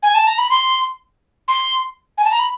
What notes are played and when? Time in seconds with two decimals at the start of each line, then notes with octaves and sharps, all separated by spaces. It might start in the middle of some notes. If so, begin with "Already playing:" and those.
0.02 G#5
0.14 A5
0.27 A#5
0.38 B5
0.50 C6
1.48 C6
2.17 G#5
2.24 A5
2.31 A#5
2.39 B5